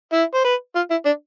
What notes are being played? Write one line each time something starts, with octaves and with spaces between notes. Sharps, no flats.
E4
C5
B4
F4
E4
D4